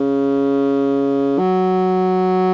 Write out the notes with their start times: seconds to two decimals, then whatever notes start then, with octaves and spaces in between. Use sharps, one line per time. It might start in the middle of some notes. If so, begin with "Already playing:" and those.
Already playing: C#3
1.39 F#3